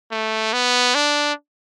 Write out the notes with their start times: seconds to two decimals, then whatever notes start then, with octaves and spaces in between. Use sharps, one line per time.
0.12 A3
0.53 B3
0.95 D4